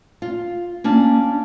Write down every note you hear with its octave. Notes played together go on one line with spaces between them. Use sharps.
F4
A#3 C#4 D4